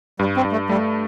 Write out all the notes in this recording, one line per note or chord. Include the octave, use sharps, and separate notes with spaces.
G2 G3
C4
G2
A3
G3 A3